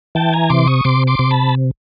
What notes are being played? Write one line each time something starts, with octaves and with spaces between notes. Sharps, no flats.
E3 G5 A5
G#5 A#5
C3 C6 D6
C#6 D#6
C3 C6 D6
C6 D6
C3
A5 B5